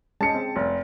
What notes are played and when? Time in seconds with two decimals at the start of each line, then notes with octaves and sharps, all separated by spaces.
0.21 G#3 C#4 G#4 A5 C#7
0.35 C4
0.56 F1